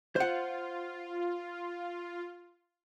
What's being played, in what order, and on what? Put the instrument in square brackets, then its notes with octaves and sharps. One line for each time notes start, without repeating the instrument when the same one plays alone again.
[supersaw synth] F4 [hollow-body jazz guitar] C5 F#5